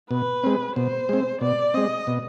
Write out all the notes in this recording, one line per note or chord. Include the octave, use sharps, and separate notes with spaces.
B2 B4
G#3 C4
B2 C5
G#3 C4
B2 D5
G#3 C4 D#5
B2